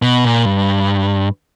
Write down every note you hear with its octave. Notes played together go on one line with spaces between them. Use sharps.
B2
A#2
G2